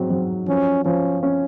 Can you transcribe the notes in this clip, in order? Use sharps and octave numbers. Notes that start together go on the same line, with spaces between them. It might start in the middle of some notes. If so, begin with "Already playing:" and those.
Already playing: G#2 F#3 C4
F#3
F3 C#4
F3 C#4
C#4